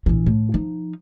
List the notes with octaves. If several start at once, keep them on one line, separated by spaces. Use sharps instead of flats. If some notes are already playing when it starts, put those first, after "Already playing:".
A#1 E3
A2
F3 D#4